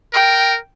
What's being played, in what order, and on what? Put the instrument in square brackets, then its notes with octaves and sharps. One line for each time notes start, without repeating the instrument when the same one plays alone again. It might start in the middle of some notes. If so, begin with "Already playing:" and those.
[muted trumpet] A#4 [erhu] G5